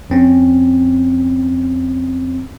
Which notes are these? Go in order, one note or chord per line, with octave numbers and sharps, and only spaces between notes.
F2 C4 C#4